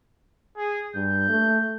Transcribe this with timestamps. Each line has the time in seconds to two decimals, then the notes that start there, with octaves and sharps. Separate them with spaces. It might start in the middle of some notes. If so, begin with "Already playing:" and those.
0.57 G#4
0.95 G2 G6
1.29 A3